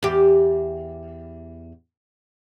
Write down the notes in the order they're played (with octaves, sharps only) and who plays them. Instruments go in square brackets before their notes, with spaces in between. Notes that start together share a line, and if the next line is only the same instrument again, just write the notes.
[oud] E2 G4